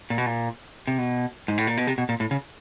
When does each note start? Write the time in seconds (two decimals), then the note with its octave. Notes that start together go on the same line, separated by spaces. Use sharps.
0.10 A#2
0.18 B2
0.26 A#2
0.87 C3
0.98 B2
1.48 G#2
1.58 A2
1.67 A#2
1.77 B2
1.87 C3
1.98 B2
2.09 A#2
2.20 A2
2.31 C#3